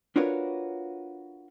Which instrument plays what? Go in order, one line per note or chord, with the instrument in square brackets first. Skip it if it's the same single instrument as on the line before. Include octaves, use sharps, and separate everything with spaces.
[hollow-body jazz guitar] D4 F4 F#4 A#4 B4 C#5